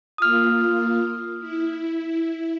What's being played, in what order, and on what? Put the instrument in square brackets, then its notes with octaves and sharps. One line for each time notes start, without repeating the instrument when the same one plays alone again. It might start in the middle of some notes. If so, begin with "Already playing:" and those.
[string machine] A#3 F4 [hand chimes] D#6 F6
[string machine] E4